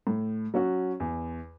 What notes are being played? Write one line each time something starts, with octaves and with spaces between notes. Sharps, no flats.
A2
F#3 C#4 F#4
E2